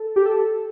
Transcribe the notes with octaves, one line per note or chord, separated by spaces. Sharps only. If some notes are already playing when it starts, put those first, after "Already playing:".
Already playing: A4
G4
A4